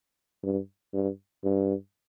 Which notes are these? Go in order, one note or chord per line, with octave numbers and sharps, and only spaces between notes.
G2
G2
G2